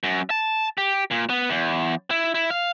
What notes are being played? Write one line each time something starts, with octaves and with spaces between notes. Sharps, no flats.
F#2
A5
G4
A#2
B3
E2
E4
E4
F5